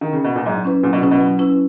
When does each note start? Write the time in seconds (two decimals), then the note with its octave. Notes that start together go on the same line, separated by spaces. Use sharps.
0.01 D#3
0.13 C#3
0.24 B2
0.36 A#2
0.46 G#2 F#3
0.64 C#4 E4 B4
0.83 A#2 F#3
0.93 B2
1.02 C#3 C#4 E4 B4
1.11 B2
1.20 F#3
1.39 C#4 E4 B4